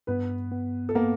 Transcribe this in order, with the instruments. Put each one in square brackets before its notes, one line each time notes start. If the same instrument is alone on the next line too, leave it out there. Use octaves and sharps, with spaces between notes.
[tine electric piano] G2 [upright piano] B3 B4
[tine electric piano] B3
[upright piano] A4
[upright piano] A#3 A#4 [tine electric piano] B3